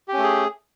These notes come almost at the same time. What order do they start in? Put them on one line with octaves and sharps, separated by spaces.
G4 C#4 A3 G#4